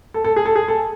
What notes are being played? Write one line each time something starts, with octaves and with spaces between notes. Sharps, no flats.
A4
A4
G#4
A4
G#4
A4